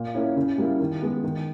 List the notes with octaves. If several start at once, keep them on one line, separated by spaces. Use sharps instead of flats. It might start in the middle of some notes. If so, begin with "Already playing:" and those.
Already playing: A#2
A#3 C#4 E4
C#3
G3 A#3 E4
D#3
G#3 B3
D#3